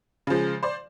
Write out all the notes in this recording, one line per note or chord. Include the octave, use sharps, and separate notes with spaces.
C#3 F3 G#3
C5 D5